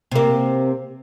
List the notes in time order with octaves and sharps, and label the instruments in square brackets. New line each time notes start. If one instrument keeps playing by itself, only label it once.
[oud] C3 A#3